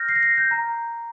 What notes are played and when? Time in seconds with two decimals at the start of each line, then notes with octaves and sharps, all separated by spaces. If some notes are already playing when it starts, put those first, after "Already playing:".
Already playing: F6 G6 A#6
0.09 C7
0.16 A#6
0.23 C7
0.37 G6
0.51 A#5